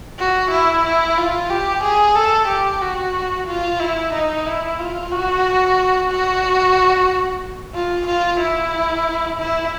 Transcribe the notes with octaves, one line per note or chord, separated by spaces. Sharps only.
F#4
E4
E4
F4
G4
G#4
A4
G4
F#4
F4
E4
D#4
E4
F4
F#4
F#4
F4
F4
E4
E4